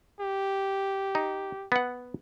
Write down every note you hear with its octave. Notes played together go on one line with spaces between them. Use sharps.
G4
D#4
B3 F#5